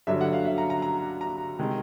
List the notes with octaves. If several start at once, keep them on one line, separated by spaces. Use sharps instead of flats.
G2 D3 F#3 E5
F#5
F5
E5
A#5
A#5
A#5
A#5
C3 D#3 G#3